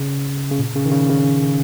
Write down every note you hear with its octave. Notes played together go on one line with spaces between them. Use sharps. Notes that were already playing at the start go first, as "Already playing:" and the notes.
Already playing: C#3
C#3
A#2
C#3
D#3
C#3
C#3